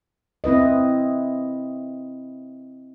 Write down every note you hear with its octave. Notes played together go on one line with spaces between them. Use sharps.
C4 E4 B4 D#5